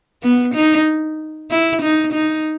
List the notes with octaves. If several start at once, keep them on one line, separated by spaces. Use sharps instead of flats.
B3
D#4
E4
D#4
D#4